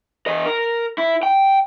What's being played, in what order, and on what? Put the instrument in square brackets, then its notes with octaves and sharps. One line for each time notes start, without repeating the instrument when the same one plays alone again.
[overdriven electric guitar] E3 D#5
A#4
E4
G5